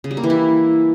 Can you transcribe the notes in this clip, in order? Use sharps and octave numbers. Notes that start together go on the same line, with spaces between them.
C#3
G3
A#3
E3
E4